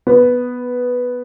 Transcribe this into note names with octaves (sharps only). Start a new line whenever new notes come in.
B3